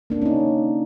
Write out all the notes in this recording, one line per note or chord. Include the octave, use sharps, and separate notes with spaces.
A#3 D4
C#4 D#4